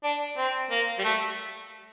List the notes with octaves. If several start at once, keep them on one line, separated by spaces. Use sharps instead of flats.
D4
C4
A#3
G3
A3